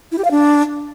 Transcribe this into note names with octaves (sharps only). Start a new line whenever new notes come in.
E4
G4
F5
D4